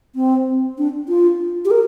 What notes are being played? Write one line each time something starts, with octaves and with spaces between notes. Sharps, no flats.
C4
D4
F4
G4
A#4